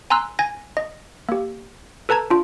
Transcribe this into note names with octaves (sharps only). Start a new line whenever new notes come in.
G#5 A#5 C6 E6 F#6
G#5 G#6 A#6
D#5
A#3 G4
A4 B4 A5 A#5 G#6
D4 F4